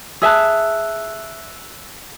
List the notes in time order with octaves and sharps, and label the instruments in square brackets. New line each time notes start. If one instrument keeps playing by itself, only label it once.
[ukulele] G#4 E5 A5 [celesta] E6 F#6